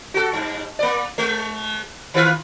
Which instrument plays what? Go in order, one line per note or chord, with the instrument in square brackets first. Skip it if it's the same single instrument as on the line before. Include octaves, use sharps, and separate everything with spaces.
[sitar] F#4 A4
G2
A#3 D5
G#3
D#3 F4 B4